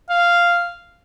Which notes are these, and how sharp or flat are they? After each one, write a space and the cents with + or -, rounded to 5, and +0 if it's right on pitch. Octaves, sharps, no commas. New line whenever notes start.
F5 -5